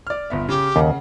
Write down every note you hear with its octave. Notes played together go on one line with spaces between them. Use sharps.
D5 F6
G1 B3 E5
C#3 G4
D#2 C#3 F#5